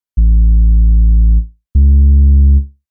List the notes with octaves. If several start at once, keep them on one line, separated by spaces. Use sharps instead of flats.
A1
C#2